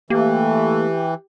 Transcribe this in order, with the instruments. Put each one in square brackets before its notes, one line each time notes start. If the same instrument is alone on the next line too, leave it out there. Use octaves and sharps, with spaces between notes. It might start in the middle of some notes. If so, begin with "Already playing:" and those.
[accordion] E3 [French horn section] A3 [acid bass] A#3 [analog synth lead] G4